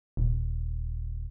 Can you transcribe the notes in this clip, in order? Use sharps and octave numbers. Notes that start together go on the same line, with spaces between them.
D#1